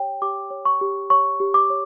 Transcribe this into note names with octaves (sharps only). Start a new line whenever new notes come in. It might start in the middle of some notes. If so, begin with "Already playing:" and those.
Already playing: G4 C#5 G5
G4 D6
C#5
C#6
G4
C#5 C#6
G4
D6
C#5